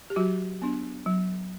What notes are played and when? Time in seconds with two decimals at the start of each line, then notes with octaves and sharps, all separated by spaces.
0.10 G4
0.16 F#3 F#4
0.62 B3 D4
1.06 F#3